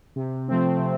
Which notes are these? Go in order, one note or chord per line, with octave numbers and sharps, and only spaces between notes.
C3
F3 A3 C4
C3